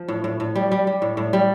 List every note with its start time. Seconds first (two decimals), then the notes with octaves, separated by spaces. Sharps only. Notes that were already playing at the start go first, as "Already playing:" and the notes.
Already playing: F3
0.08 A2
0.24 A2
0.40 A2
0.55 G3
0.72 G3
0.87 G3
1.02 A2
1.17 A2
1.33 G3